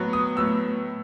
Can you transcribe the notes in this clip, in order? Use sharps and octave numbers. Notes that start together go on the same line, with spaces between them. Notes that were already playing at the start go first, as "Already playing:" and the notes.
Already playing: A2 F#3 B3
D#6
A2 F#3 B3 E6